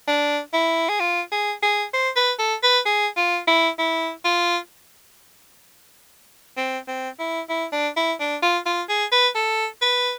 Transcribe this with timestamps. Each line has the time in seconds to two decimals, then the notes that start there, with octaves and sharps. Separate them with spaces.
0.07 D4
0.53 E4
0.89 G#4
1.00 F4
1.32 G#4
1.63 G#4
1.94 C5
2.16 B4
2.39 A4
2.63 B4
2.86 G#4
3.17 F4
3.48 E4
3.78 E4
4.25 F4
6.57 C4
6.88 C4
7.19 E4
7.49 E4
7.72 D4
7.97 E4
8.20 D4
8.42 F4
8.66 F4
8.89 G#4
9.12 B4
9.35 A4
9.82 B4